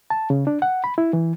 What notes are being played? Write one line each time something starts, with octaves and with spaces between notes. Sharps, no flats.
A5
C#3
D4
F#5
B5
E4
E3